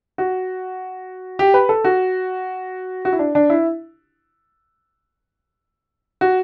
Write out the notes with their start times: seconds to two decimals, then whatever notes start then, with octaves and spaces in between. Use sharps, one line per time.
0.18 F#4
1.39 G4
1.54 B4
1.69 A4
1.84 F#4
3.05 F#4
3.12 E4
3.19 D4
3.35 D4
3.50 E4
6.21 F#4